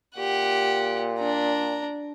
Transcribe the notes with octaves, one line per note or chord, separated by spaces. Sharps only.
A#2 G4 F#5
D4 A#5